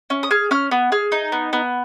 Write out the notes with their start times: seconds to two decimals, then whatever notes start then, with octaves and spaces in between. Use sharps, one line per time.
0.10 C#4
0.23 D#6
0.31 G#4 F6
0.51 C#4 F6
0.71 B3
0.92 G#4 F6
1.12 D#4
1.32 B3
1.53 B3